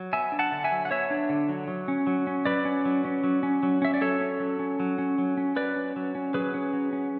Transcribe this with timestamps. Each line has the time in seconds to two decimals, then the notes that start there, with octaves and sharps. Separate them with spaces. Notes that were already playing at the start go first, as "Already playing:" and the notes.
Already playing: F#3
0.13 B3 E5 G#5
0.32 D4
0.39 F#5 A5
0.52 D3
0.64 E5 G#5
0.71 F#3
0.85 F#5
0.91 B3 C#5 E5
1.11 D4
1.30 D3
1.49 F#3
1.68 F#3
1.88 C#4
2.07 F#3
2.27 C#4
2.45 F#3 B4 D5
2.65 C#4
2.85 F#3
3.05 C#4
3.24 F#3
3.43 C#4
3.63 F#3
3.82 C#4 E5
3.94 D5
4.01 F#3 A4 C#5
4.21 C#4
4.40 F#3
4.59 C#4
4.80 F#3
4.98 C#4
5.18 F#3
5.37 C#4
5.56 F#3 B4 D5
5.76 C#4
5.96 F#3
6.15 C#4
6.34 F#3 G#4 B4
6.54 C#4
6.73 F#3
6.93 C#4